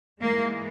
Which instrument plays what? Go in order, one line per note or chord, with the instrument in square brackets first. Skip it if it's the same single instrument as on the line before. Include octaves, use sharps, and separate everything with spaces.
[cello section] G#2 E3 G#3 A#3